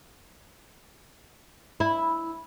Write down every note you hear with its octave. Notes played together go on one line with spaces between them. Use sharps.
E4